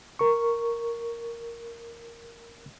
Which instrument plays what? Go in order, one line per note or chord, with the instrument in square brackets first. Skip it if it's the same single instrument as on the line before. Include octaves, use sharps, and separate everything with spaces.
[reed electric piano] A#4 C#6